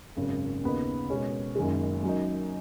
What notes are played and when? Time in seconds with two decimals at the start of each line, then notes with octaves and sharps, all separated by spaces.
0.17 G#1 F#2 C#3
0.63 D#2 C#3 B3 D#4
1.10 B2 G#3 C#4
1.56 F#1 F#2 D#3 G#3
2.03 F#2 F#3 D#4